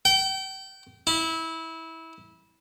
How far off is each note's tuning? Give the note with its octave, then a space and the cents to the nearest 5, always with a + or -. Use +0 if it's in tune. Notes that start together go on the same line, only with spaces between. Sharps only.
G5 -30
E4 -20